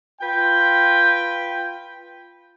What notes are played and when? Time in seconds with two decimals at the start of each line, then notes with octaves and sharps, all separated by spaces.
0.21 F4 B4 G5